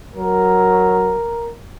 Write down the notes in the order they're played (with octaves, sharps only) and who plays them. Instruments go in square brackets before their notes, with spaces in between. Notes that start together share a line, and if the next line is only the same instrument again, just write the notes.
[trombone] F#3 [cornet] A#4